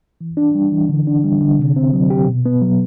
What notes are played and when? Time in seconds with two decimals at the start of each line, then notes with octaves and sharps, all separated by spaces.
0.21 E3
0.37 D4
0.55 G3
0.72 E3
0.89 D3
1.07 D4
1.24 G3
1.41 D3
1.59 C3
1.76 C4
1.94 F#3
2.10 G4
2.28 B2
2.46 B3
2.62 F#3